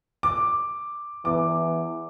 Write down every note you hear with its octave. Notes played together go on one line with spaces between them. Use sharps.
D6
E2 D6